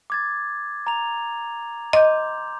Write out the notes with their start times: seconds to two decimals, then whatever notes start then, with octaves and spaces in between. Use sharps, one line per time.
0.10 D6 G#6 A6
0.87 A#5 F7
1.93 D#5 C6 D6 G6